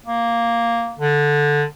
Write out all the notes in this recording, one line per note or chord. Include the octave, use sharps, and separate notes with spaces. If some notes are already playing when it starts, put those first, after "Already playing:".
A#3
D3